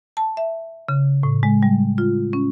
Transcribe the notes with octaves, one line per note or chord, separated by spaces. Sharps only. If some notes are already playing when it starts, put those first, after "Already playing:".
A5
E5
C#3
A2
G#3
G3
F4
C#4